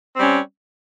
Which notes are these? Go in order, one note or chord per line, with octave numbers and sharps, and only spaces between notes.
G3 C4 C#4